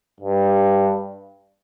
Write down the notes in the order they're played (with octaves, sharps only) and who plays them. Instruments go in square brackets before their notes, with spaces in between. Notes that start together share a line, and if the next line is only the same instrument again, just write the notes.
[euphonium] G2